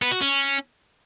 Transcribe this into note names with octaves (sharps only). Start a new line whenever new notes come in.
B3
F#4
C#4